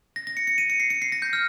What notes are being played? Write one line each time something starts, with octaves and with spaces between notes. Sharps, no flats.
A#6
A#6
C#7
C#7
D#7
C#7
C7
C#7
C7
A#6
G6
F6